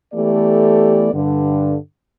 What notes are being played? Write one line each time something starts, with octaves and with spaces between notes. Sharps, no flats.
E3 A3 B3 G4 A4 D5
G2 D3